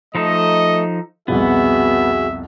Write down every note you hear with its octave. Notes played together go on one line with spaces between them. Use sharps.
F3 A3 D#4 A4 D#5
C2 F2 B2 B3 F#4 G#4 E5